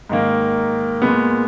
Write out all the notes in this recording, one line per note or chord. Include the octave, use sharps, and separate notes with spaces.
G#2 D#3 A#3
A#2 G#3 B3